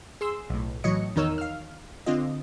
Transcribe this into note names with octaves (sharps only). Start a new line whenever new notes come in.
G#4 C6 E6
B1 A2
A2 E3 F#3 C#5 D#5 C#7
E2 D#3 D#4 A#4 C#5 E6
F5 F6
D3 C4 F4 D#5